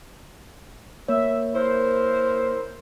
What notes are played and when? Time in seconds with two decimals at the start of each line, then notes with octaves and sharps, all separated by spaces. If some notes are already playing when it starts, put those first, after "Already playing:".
1.08 A#3 C#5 E5
1.55 E4 A#4 C5